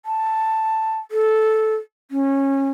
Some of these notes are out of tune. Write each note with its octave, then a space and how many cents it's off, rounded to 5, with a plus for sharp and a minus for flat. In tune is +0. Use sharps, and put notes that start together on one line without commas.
A5 +5
A4 -10
C#4 -20